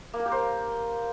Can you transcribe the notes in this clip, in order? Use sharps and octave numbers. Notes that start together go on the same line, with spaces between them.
A#3
A#4
G4
C5